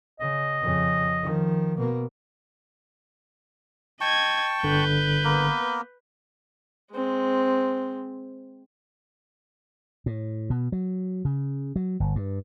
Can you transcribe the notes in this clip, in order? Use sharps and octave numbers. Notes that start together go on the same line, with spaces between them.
C#3 D#5
F2 C#3
D#3 F3
B2 A#3
D#5 G5 A5 C#6 G#6
G1 D3 B4 G6
A#3 B3 A#4
G#3 C4
A2
B2
F#3
C#3
F#3
G1
G2